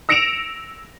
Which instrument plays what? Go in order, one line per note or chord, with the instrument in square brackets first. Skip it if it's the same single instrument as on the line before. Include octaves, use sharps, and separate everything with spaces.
[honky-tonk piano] E6 A#6 C#7 D7 E7 F7